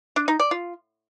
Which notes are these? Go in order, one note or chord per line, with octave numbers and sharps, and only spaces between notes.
D4
D#4
D5
F4